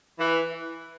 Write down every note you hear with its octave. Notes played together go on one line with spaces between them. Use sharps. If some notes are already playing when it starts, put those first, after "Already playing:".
E3